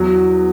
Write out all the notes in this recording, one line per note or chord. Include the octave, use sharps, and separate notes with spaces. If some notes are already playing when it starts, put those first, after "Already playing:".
Already playing: E2 F#3